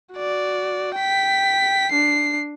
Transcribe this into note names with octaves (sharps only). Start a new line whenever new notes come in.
F#4 D5
G5 B6
D4 C7